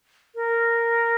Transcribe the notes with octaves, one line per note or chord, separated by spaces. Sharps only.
A#4